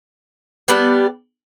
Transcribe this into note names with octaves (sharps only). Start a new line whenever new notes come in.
G3 B3 D4 G4